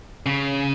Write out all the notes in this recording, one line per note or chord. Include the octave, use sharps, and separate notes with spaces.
C#3